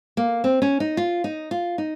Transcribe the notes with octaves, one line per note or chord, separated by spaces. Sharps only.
A#3
C4
C#4
D#4
F4
D#4
F4
D#4